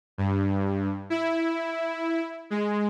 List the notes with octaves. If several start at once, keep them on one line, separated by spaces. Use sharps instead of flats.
G2
E4
G#3